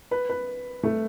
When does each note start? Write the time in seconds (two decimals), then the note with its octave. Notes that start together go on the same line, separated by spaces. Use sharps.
0.11 B4
0.29 B4
0.83 A3